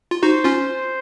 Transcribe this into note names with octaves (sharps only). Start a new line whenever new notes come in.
F4
D#4 F#4 C5
C#4 F4